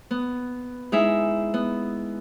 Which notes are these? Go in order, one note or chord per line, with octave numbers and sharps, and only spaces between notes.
B3
G#3 D#4 E4 G#4 E5
B3